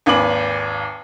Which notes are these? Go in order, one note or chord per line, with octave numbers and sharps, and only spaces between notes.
G#1 D#2 B4 G#5 D6 F#7